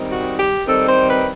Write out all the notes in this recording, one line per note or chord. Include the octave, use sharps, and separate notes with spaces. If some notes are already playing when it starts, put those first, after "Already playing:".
Already playing: D#3 G3 C4 D#4
F#4
G4
D#3 G3 C4 D#4 A4
C5
B4